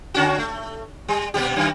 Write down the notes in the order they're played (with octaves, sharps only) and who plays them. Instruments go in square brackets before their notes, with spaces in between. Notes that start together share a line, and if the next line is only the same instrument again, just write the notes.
[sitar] D3 C#4 F#4
A3
G3
A#2 G3 G4
F#2 D#3